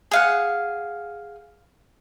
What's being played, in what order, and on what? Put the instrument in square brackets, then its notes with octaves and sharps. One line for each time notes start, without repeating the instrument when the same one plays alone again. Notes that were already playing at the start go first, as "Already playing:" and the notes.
[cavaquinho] G#4 F5 F#5